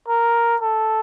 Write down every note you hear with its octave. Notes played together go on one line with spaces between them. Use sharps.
A#4
A4